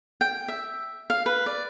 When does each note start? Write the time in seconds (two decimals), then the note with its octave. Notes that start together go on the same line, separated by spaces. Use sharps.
0.21 G5
0.48 E5
1.10 F5
1.26 B4
1.46 D5